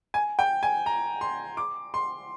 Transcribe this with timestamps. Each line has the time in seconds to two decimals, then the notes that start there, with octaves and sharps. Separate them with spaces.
0.14 G#5
0.39 G5
0.63 G#5
0.86 A#5
1.21 C6
1.57 D6
1.94 C6